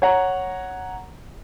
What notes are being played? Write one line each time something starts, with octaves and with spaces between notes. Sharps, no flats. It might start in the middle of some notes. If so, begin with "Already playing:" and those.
C#5 F#5 A#5